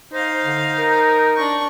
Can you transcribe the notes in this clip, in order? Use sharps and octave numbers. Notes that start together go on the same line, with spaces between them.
D#4 C5 F5
D3
A#4
D4 C#6